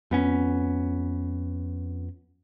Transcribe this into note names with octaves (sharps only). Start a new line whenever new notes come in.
F2 B3 C#4